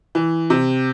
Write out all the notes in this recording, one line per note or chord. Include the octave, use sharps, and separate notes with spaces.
E3
C3